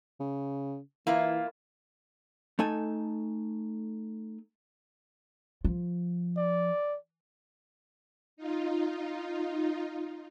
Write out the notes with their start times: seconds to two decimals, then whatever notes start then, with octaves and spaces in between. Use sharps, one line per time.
0.20 C#3
1.07 E3 A#3 E4 F4
2.59 A3 D#4 A4 G#5
5.65 F3
6.37 D5
8.37 D#4 F4